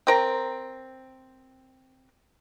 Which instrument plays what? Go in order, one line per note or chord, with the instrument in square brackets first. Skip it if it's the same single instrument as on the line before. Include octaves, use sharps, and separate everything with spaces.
[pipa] C4 A#4 A#5